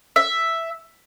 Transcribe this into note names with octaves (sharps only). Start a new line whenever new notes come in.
E5